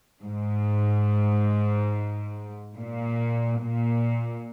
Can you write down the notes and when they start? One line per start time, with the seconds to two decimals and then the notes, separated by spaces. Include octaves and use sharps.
0.24 G#2
2.76 A#2
3.62 A#2